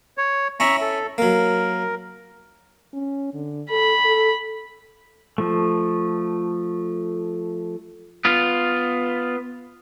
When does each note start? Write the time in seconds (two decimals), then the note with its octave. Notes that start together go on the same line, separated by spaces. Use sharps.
0.18 C#5
0.60 C#4 E4 E5 A#5 C#6
0.81 A4
1.18 F#3 A#3 A#4
2.93 C#4
3.34 D3
3.70 A4 B5
4.05 A4
5.38 F3 A3
8.25 B3 F4